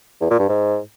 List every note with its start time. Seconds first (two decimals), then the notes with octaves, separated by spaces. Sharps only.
0.21 E2
0.30 A#2
0.39 G2
0.48 G#2